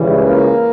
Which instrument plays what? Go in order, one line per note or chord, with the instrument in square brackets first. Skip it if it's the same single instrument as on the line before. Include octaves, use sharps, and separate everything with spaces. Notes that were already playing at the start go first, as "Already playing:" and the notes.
Already playing: [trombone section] C#2 C#3 E3 [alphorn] G3
[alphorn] A#3